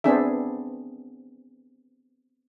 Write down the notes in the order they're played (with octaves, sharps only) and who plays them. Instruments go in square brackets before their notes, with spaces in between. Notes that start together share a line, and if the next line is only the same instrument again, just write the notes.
[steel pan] B3 C4 D4 G#4 E5